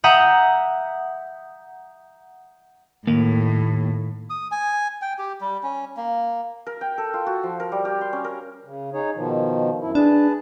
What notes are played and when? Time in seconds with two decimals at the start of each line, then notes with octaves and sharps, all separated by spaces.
0.04 E5 F#5 A#5 D#6 G6
3.07 D#2 A2 A#3
4.30 D#6
4.51 G#5
5.02 G5
5.19 G4
5.41 G3
5.63 C#4
5.97 A#3
6.67 A#4
6.81 G5
6.98 A4
7.14 F4
7.26 F#4
7.43 F3
7.60 A#4
7.72 G3
7.85 G4
8.01 C6
8.13 C#4
8.24 A#4
8.64 C#3
8.93 D#4 G#4 C#5
9.15 B2 D#3 F3
9.81 F#2 E4
9.95 D4 G#4 B4 A5